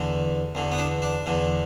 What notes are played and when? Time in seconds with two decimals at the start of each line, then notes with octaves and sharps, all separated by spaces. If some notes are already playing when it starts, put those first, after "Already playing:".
Already playing: E2 D3
0.55 E2 D3
0.72 B3
0.78 D4
1.02 D4
1.26 E2 D3